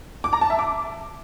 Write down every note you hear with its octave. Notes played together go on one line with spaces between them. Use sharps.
D6
A#5
A5
E5
D6